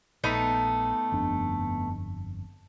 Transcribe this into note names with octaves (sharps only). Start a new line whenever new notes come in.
A#1 A3 B3 D#4
G1 F2 D4